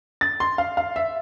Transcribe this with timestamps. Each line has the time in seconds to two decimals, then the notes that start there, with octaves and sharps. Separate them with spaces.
0.21 A6
0.40 C6
0.58 F5
0.77 F5
0.96 E5